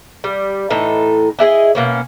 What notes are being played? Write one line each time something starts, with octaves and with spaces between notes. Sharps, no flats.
G3
A2 E3 D#4 A4
D4 E4 G#4 D#5
B2 A#3 C#4